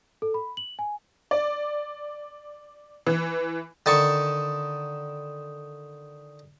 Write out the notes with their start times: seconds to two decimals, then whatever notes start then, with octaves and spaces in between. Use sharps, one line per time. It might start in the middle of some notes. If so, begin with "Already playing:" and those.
0.22 A4
0.34 B5
0.57 F#7
0.79 G#5
1.31 D5
3.07 E3
3.86 D3 D#3 A5 C#6